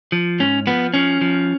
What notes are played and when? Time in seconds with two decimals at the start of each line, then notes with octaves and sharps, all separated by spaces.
0.12 F3
0.39 G#2 C#4
0.67 F3 B3
0.94 F3 C#4
1.21 F3